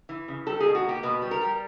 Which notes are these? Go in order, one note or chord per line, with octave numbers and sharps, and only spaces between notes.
E3
C#3
G3 A4
G#4
B2
F#4
A#3 G4
B2 B4
G3
A#4
G3